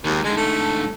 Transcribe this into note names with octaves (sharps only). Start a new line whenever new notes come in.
D#2 D#3 G#3
G#2 D3 G#3
A3